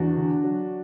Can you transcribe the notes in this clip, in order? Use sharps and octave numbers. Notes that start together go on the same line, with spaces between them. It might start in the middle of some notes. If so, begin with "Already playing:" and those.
Already playing: E2 D4 F#4
D3
F#3